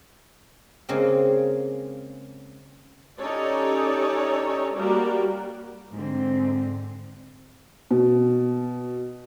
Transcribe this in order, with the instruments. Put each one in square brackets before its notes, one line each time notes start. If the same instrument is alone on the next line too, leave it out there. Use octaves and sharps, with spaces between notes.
[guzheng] C#3 G#3 A#3 C4
[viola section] C#4 D#4 G4 A4 C#5 D5
G3 A#3 F#4 G4 A#4 D5
[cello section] G#2 D3 C4
[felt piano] B2